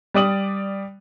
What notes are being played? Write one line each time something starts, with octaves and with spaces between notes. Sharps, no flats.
G3 D5 D#6 F#7